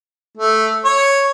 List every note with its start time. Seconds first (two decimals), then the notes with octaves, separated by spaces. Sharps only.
0.38 A3
0.85 C#5